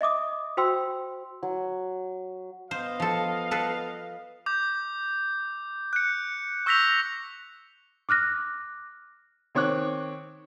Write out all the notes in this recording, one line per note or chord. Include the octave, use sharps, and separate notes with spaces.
D#5 E5 D6 D#6
F#4 C5 G5 C6 E6
F#3
B3 C5 D#5 F5
F3 A4
A4 B4
D6 G6
F#6 C#7
C#6 E6 G6 A#6 B6 F7
D6 F6 F#6 A#6
D#3 C4 C#5 C#6 D6 F#6